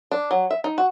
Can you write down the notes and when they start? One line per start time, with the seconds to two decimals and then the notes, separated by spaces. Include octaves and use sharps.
0.11 D4
0.31 F#3
0.51 E5
0.64 D#4
0.78 F#4